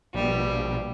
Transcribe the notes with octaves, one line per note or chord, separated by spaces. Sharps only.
A#1 B2 G3